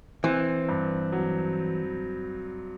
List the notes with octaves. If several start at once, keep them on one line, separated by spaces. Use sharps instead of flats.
E3 C4
G2
F#3